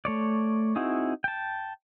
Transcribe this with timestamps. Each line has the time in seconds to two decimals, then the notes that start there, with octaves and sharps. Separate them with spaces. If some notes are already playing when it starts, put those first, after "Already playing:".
0.05 A3 C#5 D5
0.76 C4 D#4 E4 F#4 G#4
1.24 G5 A5